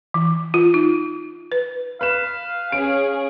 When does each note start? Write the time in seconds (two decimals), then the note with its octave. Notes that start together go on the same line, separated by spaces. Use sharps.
0.14 E3
0.54 F4
0.74 D#4
1.52 B4
2.01 B4 F5 E7
2.72 C#4 G#4 D7